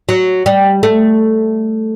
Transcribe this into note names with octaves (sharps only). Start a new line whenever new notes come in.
F#3
G3
A3